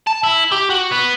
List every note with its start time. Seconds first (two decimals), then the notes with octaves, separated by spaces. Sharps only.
0.07 A5
0.23 E4
0.52 G4
0.70 F#4
0.91 B3